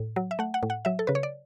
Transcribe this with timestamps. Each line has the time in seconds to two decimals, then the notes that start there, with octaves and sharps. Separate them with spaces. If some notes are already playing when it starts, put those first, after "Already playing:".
Already playing: A2
0.16 F#3
0.31 E5
0.39 A3 F#5
0.54 F#5
0.63 A2
0.70 F#5
0.85 F#3 E5
0.99 A4
1.07 C#3 B4
1.15 C#5
1.23 D5